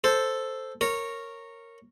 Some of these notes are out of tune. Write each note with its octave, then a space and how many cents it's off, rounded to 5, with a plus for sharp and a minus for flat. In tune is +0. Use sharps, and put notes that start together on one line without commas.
A4 +0 C5 +0
A#4 -10 C#5 -10